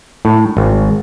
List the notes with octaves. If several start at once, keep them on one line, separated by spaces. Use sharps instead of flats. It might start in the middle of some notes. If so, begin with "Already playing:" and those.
A2
G#1